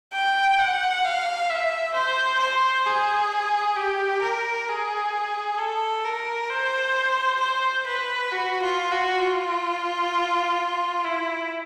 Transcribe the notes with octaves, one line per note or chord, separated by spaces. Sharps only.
G5
F#5
F5
E5
C5
C5
G#4
G4
A#4
G#4
A4
A#4
C5
C5
B4
F#4
F4
F#4
F4
E4